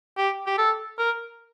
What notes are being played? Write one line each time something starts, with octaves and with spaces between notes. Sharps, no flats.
G4
G4
A4
A#4